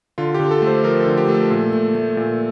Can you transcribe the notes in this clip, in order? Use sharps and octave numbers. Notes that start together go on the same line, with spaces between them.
D3 F4
G4
D3
A4
A3
C5
F3 A#4
A4
D3
G4
A3
A4
A#2
A3
A3
A#2